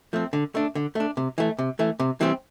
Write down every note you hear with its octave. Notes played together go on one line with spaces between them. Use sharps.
F3 A3 C4
D3
A3 D4
D3
A3 D4
C3
E3 A3
C3
E3 A3
C3
E3 G3 C4